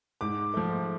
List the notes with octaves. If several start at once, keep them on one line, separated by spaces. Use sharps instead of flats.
G#2 D6
F3 A3